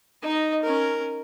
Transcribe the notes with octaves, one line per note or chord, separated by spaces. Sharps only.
D#4 D#5
C#4 A#4